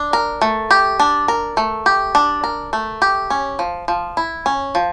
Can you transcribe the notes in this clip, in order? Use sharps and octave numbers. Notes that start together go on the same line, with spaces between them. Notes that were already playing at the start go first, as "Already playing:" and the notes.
Already playing: D4
A#4
A3
G4
D4
A#4
A3
G4
D4
A#4
A3
G4
C#4
F3
F3
E4
C#4
F3